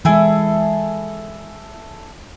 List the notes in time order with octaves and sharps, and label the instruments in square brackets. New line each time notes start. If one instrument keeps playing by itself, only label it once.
[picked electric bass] E3 G#3 [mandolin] E4 G#4 A4